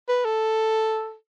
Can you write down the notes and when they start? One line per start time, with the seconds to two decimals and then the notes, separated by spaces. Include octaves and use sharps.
0.08 B4
0.25 A4